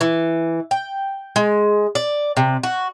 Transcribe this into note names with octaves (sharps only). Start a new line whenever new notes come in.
E3
G5
G#3
D5
C3
F#4